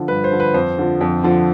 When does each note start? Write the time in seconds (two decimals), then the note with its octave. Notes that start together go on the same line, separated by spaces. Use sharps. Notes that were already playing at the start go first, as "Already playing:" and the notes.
Already playing: D3 F3
0.08 G2 B4
0.24 C5
0.32 D3 F3
0.40 B4
0.54 F2 C5
0.78 D3 F3
1.01 F2
1.23 D3 F3